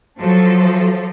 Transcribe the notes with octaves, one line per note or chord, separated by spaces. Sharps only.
F3 F#3 A4